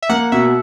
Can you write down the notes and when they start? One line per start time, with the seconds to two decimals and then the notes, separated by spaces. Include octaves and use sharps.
0.03 E5
0.09 A#3 F#5
0.32 B2 E5